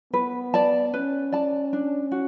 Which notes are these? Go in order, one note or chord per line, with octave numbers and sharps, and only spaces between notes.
B3 B4
D5 A5
C#4 B4
D5 A5
D4
F#4